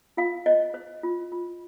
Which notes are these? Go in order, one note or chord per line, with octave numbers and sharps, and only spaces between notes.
F4 F5
C5 D#5
C5
F4
F4